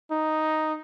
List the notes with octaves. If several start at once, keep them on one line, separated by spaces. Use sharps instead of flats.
D#4